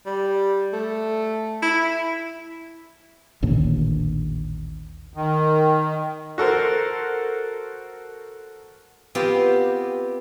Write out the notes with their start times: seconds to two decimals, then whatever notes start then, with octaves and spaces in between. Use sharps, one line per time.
0.06 G3
0.73 A3
1.63 E4
3.42 A1 D#2 A#2 D3
5.14 D#3
6.38 F#4 A4 A#4 C5
9.15 B3 C4 F4 G4